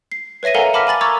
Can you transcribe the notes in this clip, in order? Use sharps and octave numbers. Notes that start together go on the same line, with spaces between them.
C7
B4 C#5 E5 A#6 D#7
A4 A#4 F5 F#5 G#5 A#5
A5 B5 D6 F6 B6
G#5 B5 A6 F#7
A#5 C#6 D6 E6 G#6 A6